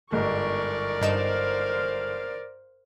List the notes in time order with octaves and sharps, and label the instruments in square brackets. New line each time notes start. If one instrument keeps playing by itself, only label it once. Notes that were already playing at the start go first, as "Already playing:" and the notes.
[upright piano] G1 G#2 [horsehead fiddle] A#4 D5 [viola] C#6
[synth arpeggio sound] G2 D#4 E7 [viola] C5 F5